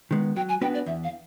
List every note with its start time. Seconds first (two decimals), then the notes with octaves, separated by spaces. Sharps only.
0.11 D#3 G#3 B3
0.36 F#3 G5
0.48 G#5
0.61 B3 D4 F#4 B4 G5
0.74 D5
0.86 E2 E5
1.03 F5